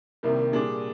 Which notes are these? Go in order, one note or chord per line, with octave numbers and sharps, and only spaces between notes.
C2 C3 D#3 G3 A#3
A#2 G3 D4 G#4